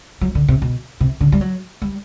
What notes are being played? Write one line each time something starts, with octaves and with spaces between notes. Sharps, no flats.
F#3
D3
C3
B2
C3
D3
G3
F#3
G3